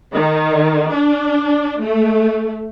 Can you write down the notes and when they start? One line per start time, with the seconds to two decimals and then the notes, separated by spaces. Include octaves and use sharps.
0.13 D#3
0.93 D4
1.80 A3